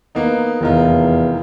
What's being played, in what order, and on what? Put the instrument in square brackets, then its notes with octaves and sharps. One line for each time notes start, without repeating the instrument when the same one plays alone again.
[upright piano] A#3 B3 D#4
[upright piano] F1 D#3 F4 [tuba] E2